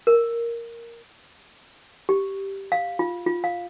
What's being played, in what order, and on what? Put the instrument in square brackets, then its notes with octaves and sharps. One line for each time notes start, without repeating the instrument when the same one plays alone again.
[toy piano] A#4
G4
F5
F4
F4
F5